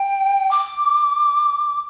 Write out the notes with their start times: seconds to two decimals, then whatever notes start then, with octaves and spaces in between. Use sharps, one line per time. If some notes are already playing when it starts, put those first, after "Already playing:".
Already playing: G5
0.51 D6